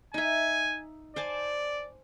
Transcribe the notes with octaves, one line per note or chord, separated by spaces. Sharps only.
D#4 E5 G#5
C5 D5 G#5 A5